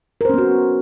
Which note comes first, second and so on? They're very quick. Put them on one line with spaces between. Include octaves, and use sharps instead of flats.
A#4 C5 C#4 B3 F#4